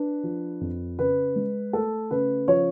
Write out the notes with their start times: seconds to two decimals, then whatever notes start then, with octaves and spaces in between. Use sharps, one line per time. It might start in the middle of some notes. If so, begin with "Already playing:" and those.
Already playing: D4 B4
0.23 F3
0.61 F2
0.99 C#3 B4
1.36 G#3
1.73 A3 A4
2.11 C#3 B4
2.48 F3 C#5